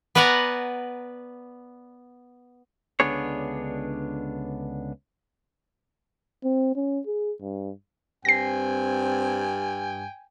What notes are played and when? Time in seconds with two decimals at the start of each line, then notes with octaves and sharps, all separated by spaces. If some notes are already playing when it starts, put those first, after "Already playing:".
0.15 B3 B4 D5 F#5 G#5 A#5
3.00 C#2 D3 B3 D4 G#4 C#5
6.44 C4
6.76 C#4
7.07 G#4
7.41 G2
8.25 G2 C4 G5 G#5 A#6 C7